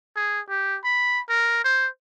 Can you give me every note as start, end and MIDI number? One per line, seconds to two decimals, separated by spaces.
0.16 0.40 68
0.49 0.78 67
0.85 1.21 83
1.29 1.64 70
1.64 1.88 72